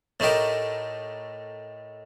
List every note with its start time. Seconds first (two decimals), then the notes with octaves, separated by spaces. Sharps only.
0.20 A2 A3 D#4 G4 A#4